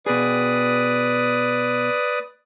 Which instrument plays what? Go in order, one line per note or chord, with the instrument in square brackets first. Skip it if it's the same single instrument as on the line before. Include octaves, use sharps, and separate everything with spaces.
[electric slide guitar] B2 G#4 [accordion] B4 D5 D#6